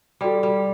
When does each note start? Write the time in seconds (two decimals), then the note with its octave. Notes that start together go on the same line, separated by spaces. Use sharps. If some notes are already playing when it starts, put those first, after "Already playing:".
0.21 G3 F#4 A4 D5 G5
0.43 G3